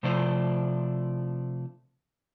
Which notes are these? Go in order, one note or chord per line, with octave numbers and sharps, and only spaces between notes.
C3 F3 A3 D4 E4 C5